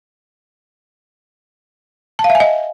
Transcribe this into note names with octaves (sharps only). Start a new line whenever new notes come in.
A5
F5
E5
G#5
D#5